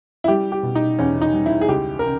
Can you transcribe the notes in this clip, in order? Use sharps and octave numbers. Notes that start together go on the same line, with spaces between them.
E4
G3 G4
G4
B2
D#4
E2 C#4
D#4
G3
E4
G#4
C#2 G4
A#4
C#3